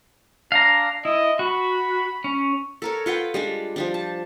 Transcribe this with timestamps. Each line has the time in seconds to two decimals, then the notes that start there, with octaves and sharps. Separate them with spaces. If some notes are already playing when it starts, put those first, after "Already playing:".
0.52 D4 F5 A#5
1.05 E4 D#5
1.39 F#4 B5
2.24 C#4
2.82 A4 A#4 C#5
3.06 F4 B4 F#5 G5
3.34 G3 G#3 D4
3.76 F3 G3 D4
3.94 A5